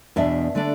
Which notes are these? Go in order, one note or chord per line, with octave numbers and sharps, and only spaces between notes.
E2 B2 B3 D4 E5
D3 A3 D4